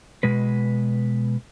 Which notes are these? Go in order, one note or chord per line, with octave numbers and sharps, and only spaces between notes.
B2 G#3 B4